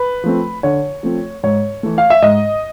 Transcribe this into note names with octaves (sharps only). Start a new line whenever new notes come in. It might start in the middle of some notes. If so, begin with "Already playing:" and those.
Already playing: B4
F3 A3 C4
D3 C#5
F3 A3 C4
G#2 C#5
E3 A3
F5
E5
G#2 D#5